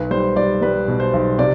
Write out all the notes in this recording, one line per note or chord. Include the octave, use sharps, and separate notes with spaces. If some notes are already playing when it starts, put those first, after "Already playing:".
Already playing: B1 B4
G3 C5
G3 D5
G3 B4
B2
C5
B1
C3 D5